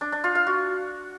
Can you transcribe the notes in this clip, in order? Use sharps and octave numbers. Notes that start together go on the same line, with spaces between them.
D4
D4
F4
F5
F#4